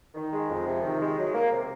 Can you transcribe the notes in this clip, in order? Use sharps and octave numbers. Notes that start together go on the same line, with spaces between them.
D#3
G#3
F2
C3
D#3
G#3
F#3
A#3
C3